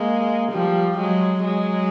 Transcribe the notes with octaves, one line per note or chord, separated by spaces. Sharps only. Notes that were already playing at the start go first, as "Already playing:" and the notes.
Already playing: G#3 A#3
F3 G3
F#3 G#3
F#3 G#3